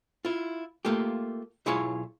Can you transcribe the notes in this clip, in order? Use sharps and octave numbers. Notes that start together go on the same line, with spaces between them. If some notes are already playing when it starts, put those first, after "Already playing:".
E4 F4
A3 A#3 F4 G4
B1 E4 F4 G#4 C#5